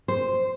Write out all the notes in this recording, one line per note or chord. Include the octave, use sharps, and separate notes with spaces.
C5